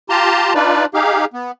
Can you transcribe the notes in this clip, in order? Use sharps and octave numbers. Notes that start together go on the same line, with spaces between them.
F4 G4 A5 A#5 C6
D4 D#4 F4 B4 D5
D#4 G4 G#4 F5
B3